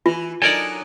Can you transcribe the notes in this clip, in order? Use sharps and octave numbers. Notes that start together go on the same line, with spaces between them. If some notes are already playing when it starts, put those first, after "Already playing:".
E3 F4
F#3 D4 D#4 A4 A#4 D5 G#5